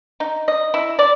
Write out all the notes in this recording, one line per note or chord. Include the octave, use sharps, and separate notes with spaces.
D#4
D#5
E4
D5